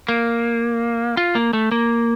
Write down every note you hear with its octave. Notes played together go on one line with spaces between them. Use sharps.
A#3
F4
A#3
A3
A#3